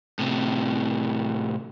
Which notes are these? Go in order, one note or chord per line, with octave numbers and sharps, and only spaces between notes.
A2 C3